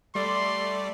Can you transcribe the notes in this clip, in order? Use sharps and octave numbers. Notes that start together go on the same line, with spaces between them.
G3 A3 D5 C6